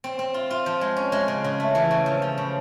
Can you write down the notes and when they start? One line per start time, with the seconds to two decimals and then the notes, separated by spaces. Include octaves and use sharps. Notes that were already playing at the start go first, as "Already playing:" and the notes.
0.04 C4
0.19 C4
0.34 F4
0.51 F4
0.66 F3
0.81 G#3
0.97 C#4
1.12 G#3
1.28 C#3
1.44 C#3
1.60 A3
1.75 E3
1.91 C#3
2.06 F3
2.22 F3
2.38 C#3